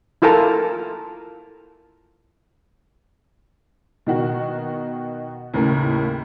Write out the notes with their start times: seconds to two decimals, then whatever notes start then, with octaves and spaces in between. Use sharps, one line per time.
0.22 E4 F4 A4 A#4 A5 A#5
4.07 B2 D#3 F#4
5.54 D#2 A2 C#3 A#3